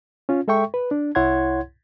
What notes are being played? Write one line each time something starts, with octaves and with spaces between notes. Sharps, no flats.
C#4 F4
G#3 A4 E5 G5 C#6
B4
D4
C2 E4 C#5 F#5 C6 G#6